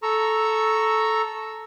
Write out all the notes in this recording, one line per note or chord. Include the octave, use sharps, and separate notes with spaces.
A4 A#5 C#6 E6